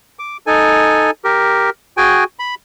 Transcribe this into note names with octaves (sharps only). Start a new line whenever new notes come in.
D6
D#4 A4 G#5
G4 A#4
F#4 G#4 G5 G#5
B5